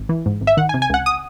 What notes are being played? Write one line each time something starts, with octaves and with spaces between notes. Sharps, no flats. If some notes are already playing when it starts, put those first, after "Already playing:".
Already playing: G#1
E3
G#2
G#1
E5
D#3 F#5
G#5
C3
G#5
C#2 F#5
D#6